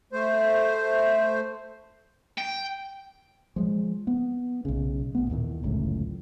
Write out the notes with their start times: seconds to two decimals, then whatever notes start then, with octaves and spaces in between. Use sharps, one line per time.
0.12 A3 C5
2.38 G5
3.56 F3 G#3
4.07 B3
4.65 B1 C#3
5.15 A1 B3
5.30 D#2 A#2 D#3 E3
5.63 G1 C#2 F#2 A2